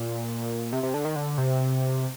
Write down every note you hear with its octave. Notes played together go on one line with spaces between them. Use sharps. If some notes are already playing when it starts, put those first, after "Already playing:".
Already playing: A#2
C3
C3
D3
D#3
D3
C3